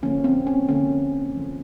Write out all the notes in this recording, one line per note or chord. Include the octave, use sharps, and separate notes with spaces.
D3 F3 A#3 C#4
C4
C#4
D3 F3 A#3 C#4
D3 F3 A#3